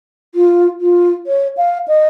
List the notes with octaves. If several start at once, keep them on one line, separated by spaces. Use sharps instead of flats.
F4
F4
C#5
F5
D#5